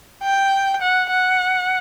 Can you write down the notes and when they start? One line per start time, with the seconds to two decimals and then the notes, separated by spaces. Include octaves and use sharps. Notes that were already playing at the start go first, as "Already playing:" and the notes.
0.23 G5
0.82 F#5
1.10 F#5